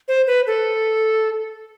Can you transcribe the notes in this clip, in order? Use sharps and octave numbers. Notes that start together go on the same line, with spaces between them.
C5
B4
A4